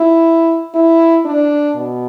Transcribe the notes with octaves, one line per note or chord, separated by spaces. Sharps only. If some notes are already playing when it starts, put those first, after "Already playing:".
Already playing: E4
E4
D4
B2